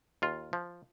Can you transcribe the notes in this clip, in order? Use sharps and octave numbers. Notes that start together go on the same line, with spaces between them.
D#2 F4
F3